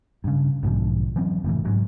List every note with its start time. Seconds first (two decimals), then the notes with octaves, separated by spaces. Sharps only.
0.24 G2 C#3
0.63 B1 G#2 D3 F3
1.16 E3 F#3 C4
1.44 F#1 A2 C3 E3
1.65 G#2 F#3